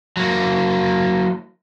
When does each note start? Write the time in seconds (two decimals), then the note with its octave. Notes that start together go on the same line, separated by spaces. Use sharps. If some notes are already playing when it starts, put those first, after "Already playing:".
0.17 F#3 A#3